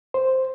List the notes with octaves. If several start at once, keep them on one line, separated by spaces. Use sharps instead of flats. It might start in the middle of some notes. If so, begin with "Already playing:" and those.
C5